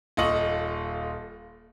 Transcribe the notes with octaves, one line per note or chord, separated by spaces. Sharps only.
D#1 F4 A4 D#5 C#6 F#7